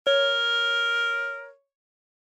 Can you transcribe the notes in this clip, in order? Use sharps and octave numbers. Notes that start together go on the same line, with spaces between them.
A#4 C#5